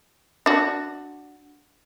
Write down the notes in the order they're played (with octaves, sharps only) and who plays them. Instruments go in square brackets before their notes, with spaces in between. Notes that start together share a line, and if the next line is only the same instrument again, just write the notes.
[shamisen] D4 F#4